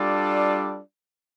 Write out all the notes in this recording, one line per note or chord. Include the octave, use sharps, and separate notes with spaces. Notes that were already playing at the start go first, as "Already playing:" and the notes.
Already playing: G3 D4 F4 A4 D5